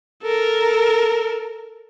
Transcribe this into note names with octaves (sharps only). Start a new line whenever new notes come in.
A4 A#4